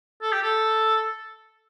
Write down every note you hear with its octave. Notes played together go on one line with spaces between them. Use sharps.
A4
G4
A4